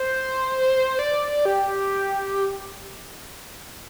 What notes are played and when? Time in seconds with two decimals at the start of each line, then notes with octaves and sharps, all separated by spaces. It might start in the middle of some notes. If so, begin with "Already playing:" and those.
Already playing: C5
0.99 D5
1.45 G4